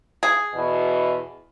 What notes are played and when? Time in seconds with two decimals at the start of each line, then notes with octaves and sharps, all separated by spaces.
0.23 G#4
0.53 E2 B2